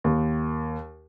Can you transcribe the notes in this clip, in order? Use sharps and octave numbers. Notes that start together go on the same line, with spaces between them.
D#2